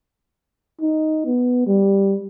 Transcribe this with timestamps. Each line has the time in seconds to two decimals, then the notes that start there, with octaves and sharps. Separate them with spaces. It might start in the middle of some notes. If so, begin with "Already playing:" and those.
0.82 D#4
1.26 B3
1.67 G3